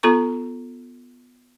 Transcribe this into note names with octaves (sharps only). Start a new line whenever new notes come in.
B3 F4 A4 A#5 C#6